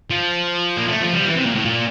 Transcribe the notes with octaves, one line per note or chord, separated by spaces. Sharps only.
F3
A#3
A3
F3
G3
F3
E3
C3
A#2
A2
A#2